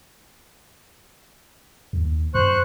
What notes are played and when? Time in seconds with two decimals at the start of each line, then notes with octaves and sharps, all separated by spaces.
1.93 D#2
2.35 F#2 C5 C#6 F#6